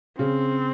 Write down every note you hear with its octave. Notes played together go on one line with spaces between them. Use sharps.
C#3 C4